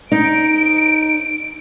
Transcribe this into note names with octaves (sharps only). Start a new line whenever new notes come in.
D#4 D7